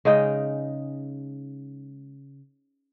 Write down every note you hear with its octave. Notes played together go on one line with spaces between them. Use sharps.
C#3 G#3 D#4 G5